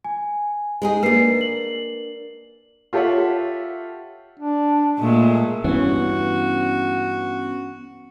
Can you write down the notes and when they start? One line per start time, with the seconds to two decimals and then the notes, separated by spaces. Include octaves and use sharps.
0.04 G#5
0.82 G#3 D#4 G#4
1.03 A#3 D4 B4 C7
1.41 F#7
2.93 F4 G4 A4 C#5 E5 F#5
4.40 D4
4.99 A#2 G#3 A3
5.64 G2 E3 B3 C#4 F#4